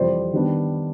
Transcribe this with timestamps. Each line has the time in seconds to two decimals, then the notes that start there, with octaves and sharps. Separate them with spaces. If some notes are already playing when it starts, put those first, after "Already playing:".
Already playing: F2 C3 E3 G3 C5 D5
0.33 D#3 G3 B3 D4